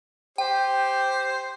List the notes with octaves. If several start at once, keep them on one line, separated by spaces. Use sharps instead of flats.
G4 C5 G5